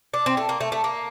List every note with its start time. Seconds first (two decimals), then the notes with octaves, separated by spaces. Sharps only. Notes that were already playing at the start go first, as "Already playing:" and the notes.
0.14 D4
0.26 C4
0.37 A3
0.49 A#3
0.61 A3
0.72 A3
0.84 A#3